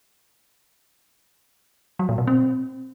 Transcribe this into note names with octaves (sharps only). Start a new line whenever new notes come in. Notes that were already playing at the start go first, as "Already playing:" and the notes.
F#3
A#2
B2
C4